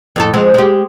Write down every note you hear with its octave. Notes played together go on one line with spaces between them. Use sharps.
F2 A2 A4
F2 G#3 C4
G#3 G4